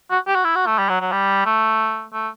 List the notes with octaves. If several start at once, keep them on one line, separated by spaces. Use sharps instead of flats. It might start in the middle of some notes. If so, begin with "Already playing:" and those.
F#4
G4
F#4
E4
F#4
A3
G3
F#3
F#3
G3
A3
A3